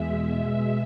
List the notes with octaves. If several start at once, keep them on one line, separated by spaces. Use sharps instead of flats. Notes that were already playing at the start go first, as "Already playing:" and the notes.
Already playing: E2 B2 G#3 E5
B2 G#3